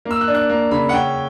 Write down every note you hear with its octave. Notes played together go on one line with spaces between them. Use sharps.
A#3
E6
F#6
D4
F#6
A#3
C#3 B5
F#5
C#4 G5